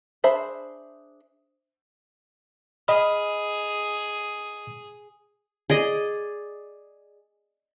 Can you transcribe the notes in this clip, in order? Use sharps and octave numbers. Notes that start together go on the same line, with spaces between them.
D4 G#4 C5 E5 B5
G#4 D#5 B5 F6
G#4 D5 D#5